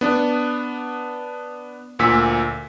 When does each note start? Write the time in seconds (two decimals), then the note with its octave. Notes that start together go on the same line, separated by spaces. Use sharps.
0.01 B3 D4
1.99 D2 A#2 E6 B6